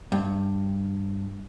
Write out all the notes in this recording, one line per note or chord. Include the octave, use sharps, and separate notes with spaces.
G2